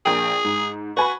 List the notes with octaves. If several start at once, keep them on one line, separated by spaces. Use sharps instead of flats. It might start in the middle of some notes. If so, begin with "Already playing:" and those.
A#1 G#4 A#4 G5
G#2
F#4 B4 G#5 B5